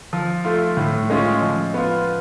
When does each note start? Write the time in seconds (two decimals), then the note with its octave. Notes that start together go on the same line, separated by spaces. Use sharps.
0.13 F3
0.45 A3 F4
0.77 A2
1.10 G#3 C#4 F4
1.42 F3
1.74 B3 F4